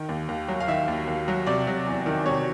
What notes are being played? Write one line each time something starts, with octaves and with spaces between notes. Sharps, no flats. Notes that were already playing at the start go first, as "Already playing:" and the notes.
Already playing: D#3
D#2
D#2
F#3
F5
D#3 E5
D#2
D#2
F#3
C3 D5
F#3
E2
D#3
C3 C#5